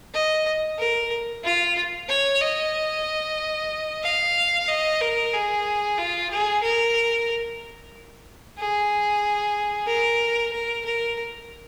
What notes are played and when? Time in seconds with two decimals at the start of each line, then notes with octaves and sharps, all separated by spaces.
0.14 D#5
0.78 A#4
1.44 F4
2.09 C#5
2.41 D#5
4.03 F5
4.68 D#5
5.01 A#4
5.33 G#4
5.98 F4
6.30 G#4
6.63 A#4
8.58 G#4
9.87 A#4
10.52 A#4
10.85 A#4